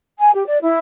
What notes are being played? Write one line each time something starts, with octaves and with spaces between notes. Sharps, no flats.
G#5
G4
D5
E4